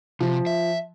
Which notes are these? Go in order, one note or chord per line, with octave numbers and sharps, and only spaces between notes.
C3 F3
E5